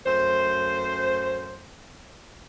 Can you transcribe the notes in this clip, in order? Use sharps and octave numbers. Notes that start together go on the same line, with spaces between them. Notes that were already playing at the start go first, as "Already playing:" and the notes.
F#2 A3 C5